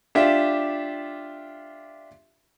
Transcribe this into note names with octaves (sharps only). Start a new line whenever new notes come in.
D4 F4 G4 E5